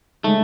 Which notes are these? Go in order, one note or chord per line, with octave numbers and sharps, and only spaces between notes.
C#3 G#3 A3 D#4